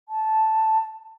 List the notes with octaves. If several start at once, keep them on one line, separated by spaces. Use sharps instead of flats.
A5